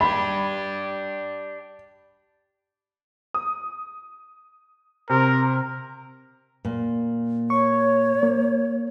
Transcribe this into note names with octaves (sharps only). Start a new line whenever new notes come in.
D4 G4 B5
D#6
C3 A#4
A#2
C#5 C#6
A#3